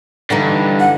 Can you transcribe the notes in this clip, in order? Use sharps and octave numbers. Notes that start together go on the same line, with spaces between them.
G2 D3 E3 D#4
F#5